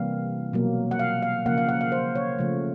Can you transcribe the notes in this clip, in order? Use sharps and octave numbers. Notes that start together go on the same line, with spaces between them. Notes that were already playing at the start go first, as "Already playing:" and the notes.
Already playing: C3 E3 G3 A#3 F5
B2 F#3 A#3
F#5
F5
F5
C#3 F3 A#3 F#5
F5
F#5
F5
C5
C#5
C#3 F3 A3